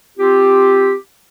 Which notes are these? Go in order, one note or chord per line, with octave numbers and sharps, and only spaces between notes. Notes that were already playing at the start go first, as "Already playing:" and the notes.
C4 F4 G4